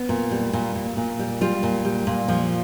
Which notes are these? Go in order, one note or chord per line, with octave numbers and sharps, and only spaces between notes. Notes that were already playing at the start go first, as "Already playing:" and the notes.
Already playing: B3
A#2
G3
A#2
A#2
A#2
G3
G3 F4
A#2
G3
A#2
F3